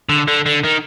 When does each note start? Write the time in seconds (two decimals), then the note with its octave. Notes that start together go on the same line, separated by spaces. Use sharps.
0.09 D3
0.28 D3
0.46 D3
0.65 D#3